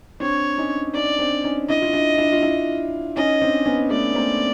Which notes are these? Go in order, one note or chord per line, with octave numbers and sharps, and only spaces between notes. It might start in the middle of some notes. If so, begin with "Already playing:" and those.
C4 D4 C#5
C#4 D#4
C#4 D#4 D5
C4 D4
C#4 D#4
D4 E4 D#5
F4
D4 E4
D4 E4
F4
D4 E4
C#4 D#4 D#5
C4 D4
B3 C#4
A3 B3 D5
A#3 C4